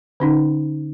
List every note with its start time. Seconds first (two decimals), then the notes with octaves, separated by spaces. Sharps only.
0.20 D3 C#4 D#4